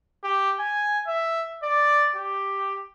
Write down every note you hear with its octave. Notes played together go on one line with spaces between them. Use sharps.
G4
G#5
E5
D5
G4